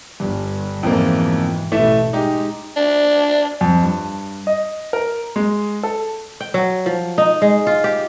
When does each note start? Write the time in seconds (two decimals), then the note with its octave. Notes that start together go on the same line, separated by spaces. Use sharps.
0.20 G1 G2
0.83 B1 F2 G#2 E3 F3 A#3
1.72 A1 B2 E3 A3 E5
2.13 G#3 D#4 G4
2.77 D4
3.61 F2
3.82 G2
4.47 D#5
4.93 A#4
5.36 G#3
5.83 A4
6.40 G5
6.54 F#3
6.86 F3
7.18 D#4
7.42 G#3
7.67 F4
7.84 G4